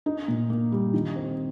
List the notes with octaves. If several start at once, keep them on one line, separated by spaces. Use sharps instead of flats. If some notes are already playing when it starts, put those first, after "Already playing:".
D#4
A#2
A#3
G3
D#3
C4